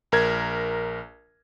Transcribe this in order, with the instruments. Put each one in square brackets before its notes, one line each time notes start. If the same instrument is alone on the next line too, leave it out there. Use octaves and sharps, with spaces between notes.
[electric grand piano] A#1 A#4 G#6